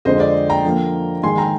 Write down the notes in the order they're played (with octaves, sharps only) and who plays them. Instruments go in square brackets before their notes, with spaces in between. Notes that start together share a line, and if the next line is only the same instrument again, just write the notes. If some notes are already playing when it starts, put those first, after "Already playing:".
[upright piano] F2 D3 G#3 C4 C5 D#5
D5
G5 A#5
D3 F3 A#3
G#2 D#3 G#3 G#5 C6
G5 A#5